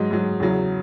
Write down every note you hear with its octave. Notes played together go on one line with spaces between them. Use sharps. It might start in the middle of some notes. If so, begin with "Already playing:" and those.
Already playing: G#2 F#3 D#5
G#2 F#3
E2 C#3 F#3